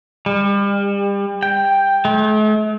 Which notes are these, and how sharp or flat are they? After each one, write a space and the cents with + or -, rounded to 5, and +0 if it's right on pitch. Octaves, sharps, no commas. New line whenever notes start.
G3 +35
G5 +5
A3 -45